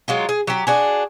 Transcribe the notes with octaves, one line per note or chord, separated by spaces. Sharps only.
F#3 G#3 F4
G#4
F#3 G4
D4 F#4 G#4